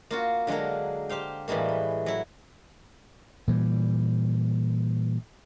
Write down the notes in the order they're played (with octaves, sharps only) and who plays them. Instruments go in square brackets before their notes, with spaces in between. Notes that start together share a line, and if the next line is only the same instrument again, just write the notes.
[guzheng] A#3 F4 F#4
D3 F#3 G#3 A#3 A#4
G4 C5 F5 G5
A2 E3 G3 G#3 A#3
B4
F#3 E4
[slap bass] A#2 E3 G3